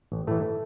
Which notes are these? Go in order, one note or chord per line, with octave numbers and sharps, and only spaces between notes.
A1
A2 E3 A3